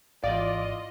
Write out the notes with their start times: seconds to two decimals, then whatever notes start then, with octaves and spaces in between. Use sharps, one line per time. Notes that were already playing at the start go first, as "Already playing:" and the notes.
0.24 G#1 E2 G#2 F4 D5 D#5 F5 D6